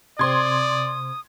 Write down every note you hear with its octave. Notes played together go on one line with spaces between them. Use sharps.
C3 C4 D5 C6 D#6 G#6